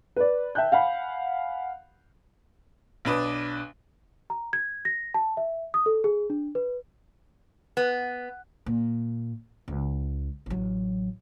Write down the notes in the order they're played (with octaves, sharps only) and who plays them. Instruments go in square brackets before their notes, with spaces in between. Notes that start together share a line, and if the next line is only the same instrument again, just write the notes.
[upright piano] B4 D5
E5 G5 A5 F#6 G6
F5 F#5 G#5 B5
B1 D4 B4 D#6
[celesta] A#5
G#6
A#6
A5
E5
D#6
A4
G#4
D4
B4
[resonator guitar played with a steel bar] B3
[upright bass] A#2
C#2
A1 F#3